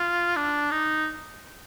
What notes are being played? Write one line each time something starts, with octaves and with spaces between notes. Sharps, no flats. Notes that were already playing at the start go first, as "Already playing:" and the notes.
Already playing: F4
D4
D#4